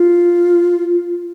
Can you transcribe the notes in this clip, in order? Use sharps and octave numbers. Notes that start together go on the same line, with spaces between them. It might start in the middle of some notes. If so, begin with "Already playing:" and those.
Already playing: F4